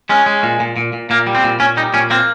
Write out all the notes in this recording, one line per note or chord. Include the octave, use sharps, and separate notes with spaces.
G#3 C#4
G#3
A#2
A#2
A#2
A#2
A#2 A#3
G3
C4
A#2
A#2 C#4
G3 D#4
A#2 C#4
A#3 C4